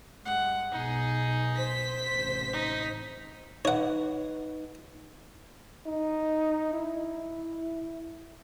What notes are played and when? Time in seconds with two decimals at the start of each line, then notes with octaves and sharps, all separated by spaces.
0.25 G2 G#3 F#5
0.72 B1 B2 D#4 G#4
1.54 C5 B6
2.11 A1 C3
2.53 D#4
3.65 D#4 B4 C#5 F#5
5.86 D#4
6.73 E4